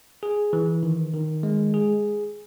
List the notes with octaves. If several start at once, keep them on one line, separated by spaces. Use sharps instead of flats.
G#4
E3
D#3
D#3
G#3
G#4